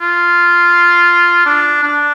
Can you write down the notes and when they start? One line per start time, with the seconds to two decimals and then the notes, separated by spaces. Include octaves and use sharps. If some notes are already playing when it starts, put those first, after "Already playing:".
0.01 F4
1.46 D4
1.83 D4